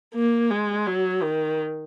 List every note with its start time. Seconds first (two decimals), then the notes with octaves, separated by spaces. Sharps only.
0.14 A#3
0.51 G#3
0.86 F#3
1.22 D#3